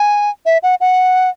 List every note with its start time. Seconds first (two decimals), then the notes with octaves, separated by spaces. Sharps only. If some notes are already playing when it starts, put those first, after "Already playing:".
Already playing: G#5
0.46 E5
0.63 F#5
0.81 F#5